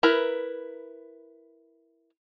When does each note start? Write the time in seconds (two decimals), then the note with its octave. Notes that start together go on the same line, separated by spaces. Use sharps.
0.03 E4 A#4 B4